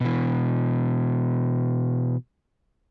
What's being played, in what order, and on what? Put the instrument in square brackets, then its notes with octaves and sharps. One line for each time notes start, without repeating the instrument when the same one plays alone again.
[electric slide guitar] B2 E3